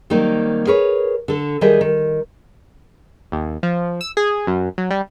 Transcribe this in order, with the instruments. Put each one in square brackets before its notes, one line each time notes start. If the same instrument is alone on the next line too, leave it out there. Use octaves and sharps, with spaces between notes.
[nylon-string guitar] D#3 F#3 G3 A#3 C4 D#4
G#4 A#4 B4 C#5
D3 A4
D#3 G3 G#4 D#5 E5
D#3
[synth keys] D#2
F3
E6
G#4
F#2
F#3
G3